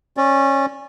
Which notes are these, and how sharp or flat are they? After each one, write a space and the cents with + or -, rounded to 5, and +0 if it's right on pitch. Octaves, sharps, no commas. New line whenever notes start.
C#4 -20 D5 -10